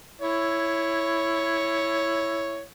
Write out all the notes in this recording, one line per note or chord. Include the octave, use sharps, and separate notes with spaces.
E4 C#5